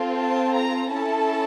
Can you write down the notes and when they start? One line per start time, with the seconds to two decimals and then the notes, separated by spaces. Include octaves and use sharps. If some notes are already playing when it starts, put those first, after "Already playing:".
Already playing: C4 F4 A4
0.19 A5
0.55 A#5
0.90 C#4 E4 A4 A5